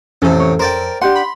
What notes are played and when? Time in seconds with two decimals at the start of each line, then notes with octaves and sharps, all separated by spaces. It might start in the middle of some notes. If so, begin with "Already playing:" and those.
0.22 A1 F2 C3 C#4 A4
0.40 C#5
0.59 A#4 C5 D5 G5
1.02 D4 G4 F#5 C6
1.15 B5